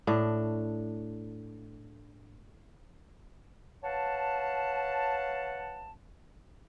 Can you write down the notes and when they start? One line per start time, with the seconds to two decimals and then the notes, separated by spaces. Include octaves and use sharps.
0.07 A2 D4
3.83 B4 C#5 F5 F#5 A5